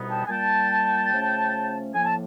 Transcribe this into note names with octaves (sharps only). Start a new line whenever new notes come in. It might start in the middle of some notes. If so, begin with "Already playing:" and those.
Already playing: C2 B2 G3 B3 D#4
G5 A5
G#5
A#2 G3 A#3 G5 A5
C#3 F3 A3 C#4
A2 F3 A#3 G#5
A5